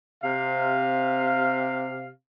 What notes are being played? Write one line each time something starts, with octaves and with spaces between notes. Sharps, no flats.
C3 F5